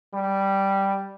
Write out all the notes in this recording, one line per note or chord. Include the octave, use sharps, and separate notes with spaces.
G3